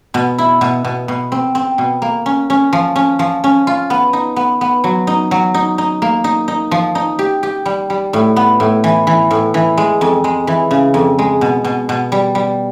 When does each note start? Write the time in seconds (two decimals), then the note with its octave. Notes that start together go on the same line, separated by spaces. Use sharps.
0.14 B2
0.38 E4
0.61 B2
0.84 B2
1.08 B2
1.32 C4
1.55 C4
1.78 B2
2.02 A#3
2.26 C#4
2.50 C#4
2.73 F3
2.96 C#4
3.19 F3
3.44 C#4
3.67 F4
3.90 B3
4.13 D#4
4.36 B3
4.61 B3
4.84 F#3
5.07 D#4
5.31 F#3
5.54 D#4
5.78 D#4
6.02 A#3
6.24 D#4
6.48 D#4
6.71 F3
6.95 D#4
7.19 G4
7.43 G4
7.66 G3
7.90 G3
8.13 A2
8.36 B3
8.60 A2
8.84 E3
9.07 E3
9.31 A2
9.54 E3
9.77 G#3
10.01 F2
10.24 G#3
10.47 E3
10.71 C#3
10.94 F2
11.19 G#3
11.41 B2
11.64 B2
11.89 B2
12.12 G3
12.35 G3